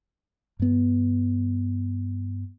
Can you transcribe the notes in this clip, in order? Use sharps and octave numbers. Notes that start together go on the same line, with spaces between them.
G2 B3